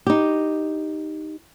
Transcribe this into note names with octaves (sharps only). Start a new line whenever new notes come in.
D#4 G4